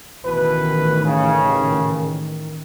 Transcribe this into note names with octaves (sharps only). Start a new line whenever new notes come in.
A1 B2 D#3 E3 B4
C#3